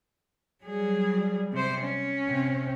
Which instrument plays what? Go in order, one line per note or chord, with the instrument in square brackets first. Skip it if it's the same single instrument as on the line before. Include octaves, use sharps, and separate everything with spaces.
[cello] F#3 G#4 [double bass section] G3
[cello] C3 C5
C#4
[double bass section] C3 C4